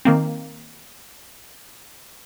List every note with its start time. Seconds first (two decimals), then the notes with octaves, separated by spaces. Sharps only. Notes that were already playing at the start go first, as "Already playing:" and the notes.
0.05 D#3 A#3 C4